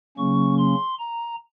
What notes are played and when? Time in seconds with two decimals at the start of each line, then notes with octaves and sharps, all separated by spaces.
0.17 C#3 F#3 A#3 C#4 C#6
0.58 C6
0.99 A#5